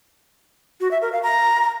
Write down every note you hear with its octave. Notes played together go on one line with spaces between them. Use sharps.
F#4
E5
A#4
F5
A#5